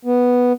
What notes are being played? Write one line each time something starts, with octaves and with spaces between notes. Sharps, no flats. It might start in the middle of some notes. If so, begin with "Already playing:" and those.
B3